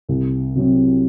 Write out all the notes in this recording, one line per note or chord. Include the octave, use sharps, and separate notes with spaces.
C2
C3 F#3 C4